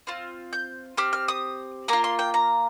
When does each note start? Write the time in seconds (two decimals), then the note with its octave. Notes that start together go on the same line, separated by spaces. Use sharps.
0.07 C4 F4 F6
0.53 G6
0.97 C4 G4 F6
1.13 F6
1.28 D#6
1.88 A#3 F4 A#5
2.04 C6
2.19 G5
2.34 A#5